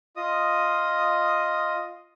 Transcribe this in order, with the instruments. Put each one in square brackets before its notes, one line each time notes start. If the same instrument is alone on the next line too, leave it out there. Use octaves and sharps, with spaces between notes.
[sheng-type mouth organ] F4 D#5 D#6